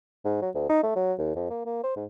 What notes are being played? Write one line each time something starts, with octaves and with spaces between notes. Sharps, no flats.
G#2
F#3
D2
D#4
A3
F#3
D#2
F2
A#3
A#3
C5
G#2